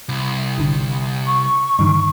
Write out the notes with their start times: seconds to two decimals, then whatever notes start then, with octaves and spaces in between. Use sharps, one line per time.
0.09 C2
0.58 G#1 D3
1.26 C#6
1.79 G2 D3 D#3